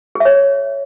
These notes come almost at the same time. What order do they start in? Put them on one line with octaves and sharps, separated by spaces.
G#4 E5 C#5